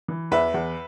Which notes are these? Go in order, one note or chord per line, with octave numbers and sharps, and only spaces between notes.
E3
E2 B4 E5
E2